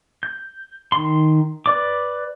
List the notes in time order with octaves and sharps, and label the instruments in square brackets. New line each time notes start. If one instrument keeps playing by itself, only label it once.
[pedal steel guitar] G6
D#3 C6
B4 D5 D6